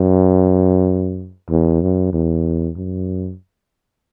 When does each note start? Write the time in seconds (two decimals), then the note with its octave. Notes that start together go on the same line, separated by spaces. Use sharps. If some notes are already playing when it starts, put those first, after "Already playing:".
Already playing: F#2
1.50 E2
1.82 F#2
2.13 E2
2.77 F#2